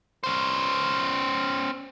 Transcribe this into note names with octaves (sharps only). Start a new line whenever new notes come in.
C#4 C5